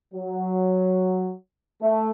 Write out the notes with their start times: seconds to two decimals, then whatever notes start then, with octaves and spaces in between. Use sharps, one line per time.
0.14 F#3
1.82 A3